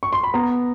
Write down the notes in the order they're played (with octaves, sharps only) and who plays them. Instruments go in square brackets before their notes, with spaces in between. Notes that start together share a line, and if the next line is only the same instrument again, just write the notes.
[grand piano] C#6
C6
B5
B3 A#5